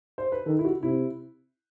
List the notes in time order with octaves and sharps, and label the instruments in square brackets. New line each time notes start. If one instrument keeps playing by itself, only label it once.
[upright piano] C5
B4
[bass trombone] D#3 [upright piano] A4
[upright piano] E4
F#4
[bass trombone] C3 [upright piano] E4